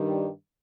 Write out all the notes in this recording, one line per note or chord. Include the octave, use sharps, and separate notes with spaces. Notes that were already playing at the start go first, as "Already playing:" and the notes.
Already playing: G2 D#3 G3